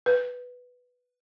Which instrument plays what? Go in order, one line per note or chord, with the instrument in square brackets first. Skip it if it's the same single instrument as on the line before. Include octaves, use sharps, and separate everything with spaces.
[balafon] B4